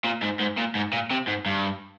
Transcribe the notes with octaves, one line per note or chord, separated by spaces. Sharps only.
A#2
G#2
G#2
A#2
G#2
A#2
C3
G#2
G2